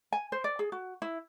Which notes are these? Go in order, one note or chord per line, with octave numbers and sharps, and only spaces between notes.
G#5
C5
D5
G#4
F#4
E4